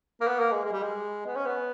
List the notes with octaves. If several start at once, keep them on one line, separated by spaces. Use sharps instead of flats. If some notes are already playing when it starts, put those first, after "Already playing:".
A#3
B3
A#3
G#3
G#3
G3
G#3
B3
C#4
B3